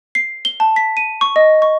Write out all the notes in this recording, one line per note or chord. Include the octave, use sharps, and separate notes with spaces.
C7
G7
A5
B6
D#7
C#6
D#5
C#6